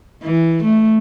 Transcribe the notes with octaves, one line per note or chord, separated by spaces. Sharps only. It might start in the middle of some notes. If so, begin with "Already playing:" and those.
E3
A3